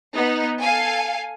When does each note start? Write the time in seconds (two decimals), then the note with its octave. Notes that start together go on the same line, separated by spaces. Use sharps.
0.15 B3 D#4
0.61 A4 F5 G#5